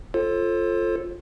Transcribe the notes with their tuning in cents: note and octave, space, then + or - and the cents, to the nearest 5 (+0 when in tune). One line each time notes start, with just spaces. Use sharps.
F4 +0 A4 +0 C5 +35